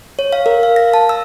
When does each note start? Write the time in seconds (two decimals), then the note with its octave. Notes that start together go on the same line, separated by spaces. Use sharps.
0.19 C#5
0.33 F5
0.46 A#4
0.63 F5
0.76 A#6
0.94 A5
1.09 E6